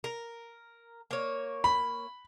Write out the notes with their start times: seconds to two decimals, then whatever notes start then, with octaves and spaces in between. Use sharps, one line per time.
0.04 A#4
1.11 A#3 C#5
1.64 B5